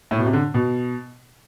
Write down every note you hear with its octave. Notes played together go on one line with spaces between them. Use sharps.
A2
B2
C3
D3
B2